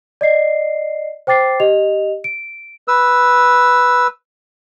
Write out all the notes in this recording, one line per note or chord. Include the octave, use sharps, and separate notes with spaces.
D5 D#5 C7
C5 G5 D6 A6 C7
G4 D#5 F7
D7
B4 E6